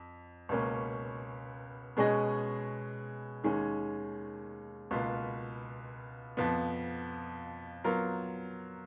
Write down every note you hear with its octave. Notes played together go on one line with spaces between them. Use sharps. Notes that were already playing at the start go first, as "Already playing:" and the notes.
Already playing: F2
C#2 B2 A#3 C#4
B2 G#3 C#4 G#4 D#5
D#2 D#3 G#3 C#4
C#2 B2 A#3 F4 B4
F2 F3 B3
F#3 B3 F4 A#4